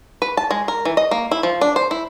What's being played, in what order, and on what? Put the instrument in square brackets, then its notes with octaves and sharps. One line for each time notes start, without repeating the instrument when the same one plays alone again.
[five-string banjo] B4
A5
G#3
A#4
E3
D#5
A#3
E4
F3
D4
C5
E4